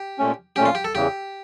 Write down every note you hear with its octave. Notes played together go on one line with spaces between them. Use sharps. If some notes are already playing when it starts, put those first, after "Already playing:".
Already playing: G4
A#2 A3 C#4
A#2 A3 C#4 G4
F4
G4
A4
E2 C#3 E3 G4